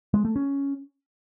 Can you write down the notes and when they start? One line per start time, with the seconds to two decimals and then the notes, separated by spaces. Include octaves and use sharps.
0.14 G#3
0.25 A3
0.36 C#4